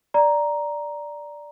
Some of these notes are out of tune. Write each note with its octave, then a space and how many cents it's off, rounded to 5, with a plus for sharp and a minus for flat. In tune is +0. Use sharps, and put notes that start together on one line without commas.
D5 +0 A#5 +5